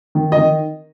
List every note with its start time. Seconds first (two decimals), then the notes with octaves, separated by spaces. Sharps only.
0.15 D#3
0.32 D#5
0.37 D#3